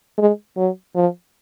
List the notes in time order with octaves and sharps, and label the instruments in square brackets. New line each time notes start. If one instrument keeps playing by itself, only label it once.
[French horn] G#3
F#3
F3